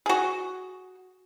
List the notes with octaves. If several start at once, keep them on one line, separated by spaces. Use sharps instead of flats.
F#4 G#4